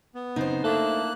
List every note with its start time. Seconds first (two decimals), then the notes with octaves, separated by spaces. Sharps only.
0.15 B3
0.36 F#2 C#3 C4 D#4 C5
0.64 A3 A#3 D4 E4 A4 F#6